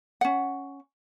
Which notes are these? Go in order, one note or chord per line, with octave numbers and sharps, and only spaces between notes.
C#4 F#5